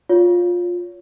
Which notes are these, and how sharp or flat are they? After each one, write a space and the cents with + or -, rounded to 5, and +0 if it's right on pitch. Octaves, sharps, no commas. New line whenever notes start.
F4 +15 C#5 +20